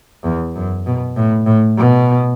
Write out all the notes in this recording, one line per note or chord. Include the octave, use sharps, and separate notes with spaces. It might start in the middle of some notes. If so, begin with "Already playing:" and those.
E2
F#2
B2
A2
A2
B2